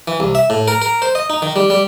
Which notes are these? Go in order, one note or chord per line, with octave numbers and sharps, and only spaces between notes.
E3
C2
E5
A2
A#4
A#4
C5
D#5
D#4
D#3
G3
G3